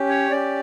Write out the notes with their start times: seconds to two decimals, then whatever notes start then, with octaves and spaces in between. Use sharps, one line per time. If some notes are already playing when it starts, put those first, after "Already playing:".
Already playing: C#4 G4
0.09 C#5
0.31 C#4 G4 D5